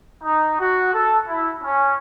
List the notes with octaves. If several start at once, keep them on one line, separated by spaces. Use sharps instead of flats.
D#4
F#4
A4
E4
C#4